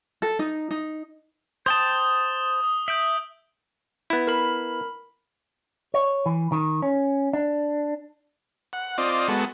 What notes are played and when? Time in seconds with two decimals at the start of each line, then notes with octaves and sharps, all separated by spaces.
0.22 A4
0.39 D#4
0.71 D#4
1.66 C5 G5 A5 D#6 G7
2.64 D#6
2.88 E5 G6 D7 F#7
4.10 B3 E4
4.27 A#4 B5
5.94 C#5
6.26 E3
6.52 D#3
6.82 C#4
7.33 D4
8.73 F#5
8.98 C4 F4 D5 D#5
9.28 G#3 B3 F#4 A4